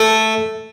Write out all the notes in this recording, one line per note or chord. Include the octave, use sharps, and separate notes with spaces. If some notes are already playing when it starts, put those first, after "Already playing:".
Already playing: A3